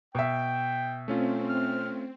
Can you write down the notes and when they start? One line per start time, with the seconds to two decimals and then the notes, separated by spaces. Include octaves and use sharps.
0.15 B2 E5 G5
1.08 A3 C4 C#4 F4
1.49 F6